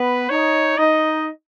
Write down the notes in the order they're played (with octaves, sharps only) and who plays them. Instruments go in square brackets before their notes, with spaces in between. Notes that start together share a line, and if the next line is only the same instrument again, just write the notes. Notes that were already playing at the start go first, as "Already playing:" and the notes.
Already playing: [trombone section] B3 [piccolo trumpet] B4
[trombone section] D#4 [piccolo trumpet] C#5
[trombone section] D#4 [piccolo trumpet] D#5